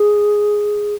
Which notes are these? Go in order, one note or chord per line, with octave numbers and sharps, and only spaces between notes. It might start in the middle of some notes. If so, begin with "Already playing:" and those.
Already playing: G#4